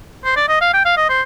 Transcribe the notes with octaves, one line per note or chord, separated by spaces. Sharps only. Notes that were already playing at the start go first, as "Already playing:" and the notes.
C5
D5
D#5
F5
G5
F5
D#5
C5